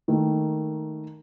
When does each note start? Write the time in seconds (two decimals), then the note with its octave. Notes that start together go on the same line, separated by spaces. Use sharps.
0.08 D#3 A3 A#3